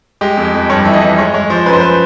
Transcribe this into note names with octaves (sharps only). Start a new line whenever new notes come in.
G#3 G4
F2
F2
G2 C#5
E3 E5
D#5
E3
G#3 C#5
G#3 C#5
F3 C5
F#2 B4
C5
B4